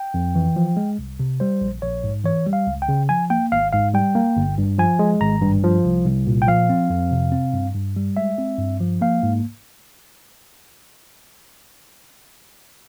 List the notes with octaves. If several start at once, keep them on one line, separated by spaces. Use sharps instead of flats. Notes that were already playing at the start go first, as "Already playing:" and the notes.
Already playing: G5
F2
E3
F3
G#3
C2
C3
G3 C5
A#1
A#1 C#5
G#2
E3 C#5
G3
F5
C#2
G5
C#3
F3 G#5
A#3 G5
G#1 F5
G#2 F5
G3 G5
A#3
G1
G2
F3 G#5
G#3
G#1 A#5
G2
F3
C2
C2
A#2
G5
F3 F5
C4
F2
C3
C4
G2
G2
G3
G#3 E5
C4
G2
F3
A#3 F5
G#2